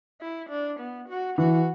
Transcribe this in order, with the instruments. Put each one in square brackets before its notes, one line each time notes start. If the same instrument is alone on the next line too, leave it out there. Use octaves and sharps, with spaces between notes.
[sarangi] E4
D4
B3
F#4
[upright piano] E3 [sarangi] F#4